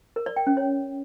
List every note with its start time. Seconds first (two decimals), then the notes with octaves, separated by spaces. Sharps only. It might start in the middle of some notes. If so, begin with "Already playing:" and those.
0.16 A#4
0.26 D5
0.36 G5
0.47 C#4
0.57 C#5